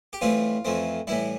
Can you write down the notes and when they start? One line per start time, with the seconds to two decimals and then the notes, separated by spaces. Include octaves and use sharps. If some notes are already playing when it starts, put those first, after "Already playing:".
0.13 G4
0.21 A2 E3 G3 C4 F4
0.65 F2 E3 A3 C4
1.07 A2 E3 G3 E4